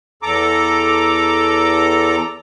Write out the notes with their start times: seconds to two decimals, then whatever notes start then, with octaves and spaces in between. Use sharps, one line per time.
0.23 E2 A4 A#5 D6